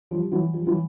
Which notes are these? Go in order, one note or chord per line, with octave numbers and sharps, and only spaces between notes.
F3 G3
E3 F#3
F3 G3
E3 F#3